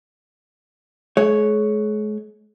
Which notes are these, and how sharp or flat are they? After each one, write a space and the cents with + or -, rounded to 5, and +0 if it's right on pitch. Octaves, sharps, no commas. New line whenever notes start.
G#3 +40 C#5 +0